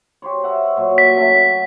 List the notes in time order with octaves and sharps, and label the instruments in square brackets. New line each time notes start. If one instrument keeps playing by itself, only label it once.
[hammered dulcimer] G4 C5 C#5
A#4 E5 F#5
A#2 F#3 C#6
[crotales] B6
[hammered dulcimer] A3 C#4